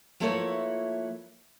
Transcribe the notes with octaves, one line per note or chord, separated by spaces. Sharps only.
F3 A3 A#3 E4 B4 C#5